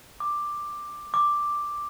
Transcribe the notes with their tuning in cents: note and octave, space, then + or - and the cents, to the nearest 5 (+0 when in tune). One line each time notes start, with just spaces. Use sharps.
D6 +10
D6 +5